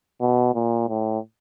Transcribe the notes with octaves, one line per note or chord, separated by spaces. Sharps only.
B2
A#2
A2